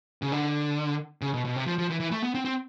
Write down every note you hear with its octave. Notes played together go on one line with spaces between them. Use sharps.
C#3
D3
C#3
B2
B2
C3
F3
F3
E3
E3
A3
B3
C4
C4